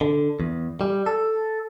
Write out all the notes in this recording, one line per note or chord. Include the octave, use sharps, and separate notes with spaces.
D3
E2
G3
A4